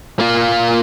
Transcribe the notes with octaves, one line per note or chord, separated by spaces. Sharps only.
A#3 F4